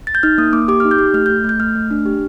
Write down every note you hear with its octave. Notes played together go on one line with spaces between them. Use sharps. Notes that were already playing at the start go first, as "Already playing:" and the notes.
A6
G6
D#4 F6
A#3 D#6
A#3 D6
G4 D6
F6
D#4
G6
G4
A3 F6
G6
A3
A3 G6
A3 F6
A3
D4
G4